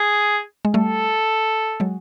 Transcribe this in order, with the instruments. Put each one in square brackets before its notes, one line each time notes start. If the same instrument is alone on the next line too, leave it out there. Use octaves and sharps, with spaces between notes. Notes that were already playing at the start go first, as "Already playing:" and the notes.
Already playing: [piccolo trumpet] G#4
[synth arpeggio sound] G#3
[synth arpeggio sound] G3 A3 [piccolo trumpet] A4
[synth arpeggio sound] F#3 G#3